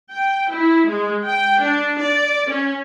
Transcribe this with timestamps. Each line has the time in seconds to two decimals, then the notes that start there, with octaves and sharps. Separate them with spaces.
0.10 G5
0.50 E4
0.87 G#3
1.25 G5
1.59 D4
1.99 D5
2.47 C#4